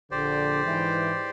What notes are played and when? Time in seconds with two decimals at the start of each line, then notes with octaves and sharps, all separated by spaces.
0.11 A#1 D3 G4 C5 D5
0.66 G#2 E3